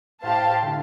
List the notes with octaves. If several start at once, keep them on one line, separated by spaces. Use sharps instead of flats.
A2 G4 C5 F5 A5
A2 D3